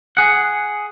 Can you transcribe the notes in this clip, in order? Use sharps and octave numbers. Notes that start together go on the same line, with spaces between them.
G#4 F#5